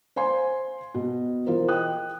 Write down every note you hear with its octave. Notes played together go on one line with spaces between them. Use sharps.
C5 F5 G#5 C6
B2
E3 F4 A#4 C5
D#5 G5 D#6 F#6